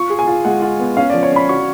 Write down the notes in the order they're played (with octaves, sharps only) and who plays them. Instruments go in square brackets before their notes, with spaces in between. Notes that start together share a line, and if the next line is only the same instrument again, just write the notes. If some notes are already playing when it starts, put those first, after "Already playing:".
Already playing: [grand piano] F4 [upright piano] C#6
[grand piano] G#4
[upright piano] G#5
[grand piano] F4
[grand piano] G#3 [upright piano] F#5
[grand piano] F4
B3
[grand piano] C#4 [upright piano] F5
[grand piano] F3 [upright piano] D5
[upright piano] C#5
[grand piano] C#4 [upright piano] B5
[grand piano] F#4 [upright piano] C#6